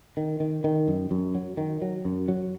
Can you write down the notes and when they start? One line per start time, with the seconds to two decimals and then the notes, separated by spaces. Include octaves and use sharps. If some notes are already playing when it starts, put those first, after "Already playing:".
0.17 D#3
0.40 D#3
0.64 D#3
0.88 F#2
1.11 F#2
1.35 F#3
1.57 D#3
1.82 F#3
2.05 F#2
2.28 F#3